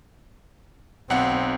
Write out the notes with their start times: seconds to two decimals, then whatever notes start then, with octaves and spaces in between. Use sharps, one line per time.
1.10 B1 C4 F#5